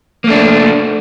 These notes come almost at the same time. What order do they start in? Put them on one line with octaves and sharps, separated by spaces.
A#3 A3 D4